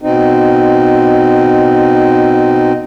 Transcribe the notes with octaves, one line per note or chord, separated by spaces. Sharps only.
B2 C4 D#4